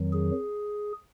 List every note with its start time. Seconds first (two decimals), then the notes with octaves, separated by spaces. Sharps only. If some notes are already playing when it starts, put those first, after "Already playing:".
Already playing: F2 D#3 F#3
0.13 G#4